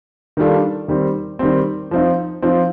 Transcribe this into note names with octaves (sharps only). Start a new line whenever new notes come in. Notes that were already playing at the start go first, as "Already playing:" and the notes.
D#3 G3 D4 F4 A4
D#3 G3 C4
D#3 G3 C4
F3 C4 D#4
F3 C4 D#4